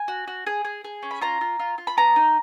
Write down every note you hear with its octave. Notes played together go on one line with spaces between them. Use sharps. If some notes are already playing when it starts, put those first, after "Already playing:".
Already playing: G#5
F#4
F#4
G#4
G#4
G#4
C#4
B5
F4 A#5
F4
F4
F4
B5
B3 A#5
D#4